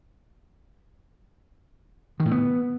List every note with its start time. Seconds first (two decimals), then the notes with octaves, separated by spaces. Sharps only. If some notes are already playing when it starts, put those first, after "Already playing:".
2.20 D#3
2.26 A2
2.31 B3